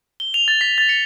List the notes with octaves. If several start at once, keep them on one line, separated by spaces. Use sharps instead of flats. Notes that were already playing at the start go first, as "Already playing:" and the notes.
G7
F7
A6
B6
A6
C#7